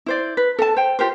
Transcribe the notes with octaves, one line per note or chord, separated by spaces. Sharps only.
E4 C5 D5
B4
A4 F#5 A5
C5 G5
F4 G4 A#4 C5